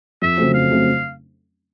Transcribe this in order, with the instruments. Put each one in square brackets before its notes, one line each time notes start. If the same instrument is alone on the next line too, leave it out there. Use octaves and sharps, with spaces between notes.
[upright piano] F2 [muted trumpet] E5
[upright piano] C#3 F#3 A3 C4
[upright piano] F2 [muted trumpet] F5
[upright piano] C#3 F#3 A3 C4